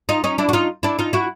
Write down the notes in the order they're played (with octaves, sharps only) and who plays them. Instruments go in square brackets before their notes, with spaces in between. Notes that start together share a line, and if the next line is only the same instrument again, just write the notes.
[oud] D#4 F4
C#4 D#4
D4 E4
F#4
D#4 F4
D4 E4
D#4 F4
E4 F#4